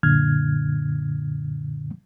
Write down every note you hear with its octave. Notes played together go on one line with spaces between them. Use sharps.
F#2 A#2 D3 F6 G#6